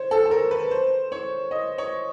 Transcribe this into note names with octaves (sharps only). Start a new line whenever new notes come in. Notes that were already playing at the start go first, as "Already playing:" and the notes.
Already playing: C5 C#5
A4
A4
A#4
B4
C5
C#5
D#5
C#5